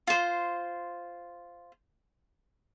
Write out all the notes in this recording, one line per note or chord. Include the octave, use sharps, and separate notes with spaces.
F4 C5